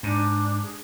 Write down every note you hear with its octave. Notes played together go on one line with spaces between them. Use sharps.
G#2 D4
G#4